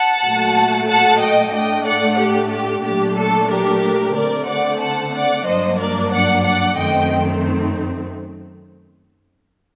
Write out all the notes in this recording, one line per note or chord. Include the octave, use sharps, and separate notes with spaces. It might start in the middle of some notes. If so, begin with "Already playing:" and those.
Already playing: F#5 A5
A#2 F#3 A3
F#5 A5
D#5 G5
A2 A3 D4 D#5 G5
D5 F#5
G4
G4
A#2 F#3 A3 D4 G4
A4
G4 A#4
D3 A3 C4 A#4 D5
D5 F#5
F#5 A5
D5 F#5
G2 F#3 A#3 D4 C5 D#5
A#4 D5
D5 F#5
D5 F#5
F#2 D#3 A3 C4 D#5 G5